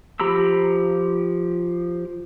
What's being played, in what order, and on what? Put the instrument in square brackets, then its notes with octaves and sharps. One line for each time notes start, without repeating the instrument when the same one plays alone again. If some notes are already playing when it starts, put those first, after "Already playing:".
[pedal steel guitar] F3 G4 A#5 B5 E6